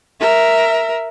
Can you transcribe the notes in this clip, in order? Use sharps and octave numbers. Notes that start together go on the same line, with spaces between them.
A#4 E5